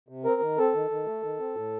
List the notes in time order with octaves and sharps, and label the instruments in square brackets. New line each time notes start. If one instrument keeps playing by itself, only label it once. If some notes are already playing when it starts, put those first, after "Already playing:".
[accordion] C3
C4 A#4
D#3
C4 A4
D#3
D#3
A3
D#3
C4
A2